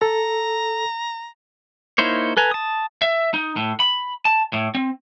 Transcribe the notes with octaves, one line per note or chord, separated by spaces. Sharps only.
A4 A#5
A#3 D#4 E4 C5 C#5
A4 B4 G#5 A#5
A5 D#6
E5
D#4
A2
B5
A5
A2
C4